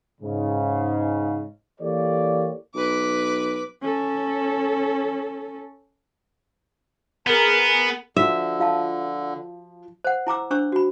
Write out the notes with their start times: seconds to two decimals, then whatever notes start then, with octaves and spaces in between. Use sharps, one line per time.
0.21 G#2 C#3
1.81 E3 A#3 G4 A4 C#5 D5
2.75 B1 B4 D6
3.82 C#4 A4
7.27 B3 G#4 A#4
8.17 D3 F3 F#4 E5
8.60 F4 F5 A5
10.04 C5 F#5
10.27 E4 A#5 D6 E6
10.51 D4 C5 C#6 E6
10.72 F#4 B5